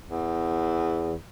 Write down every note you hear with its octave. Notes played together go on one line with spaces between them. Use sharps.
E2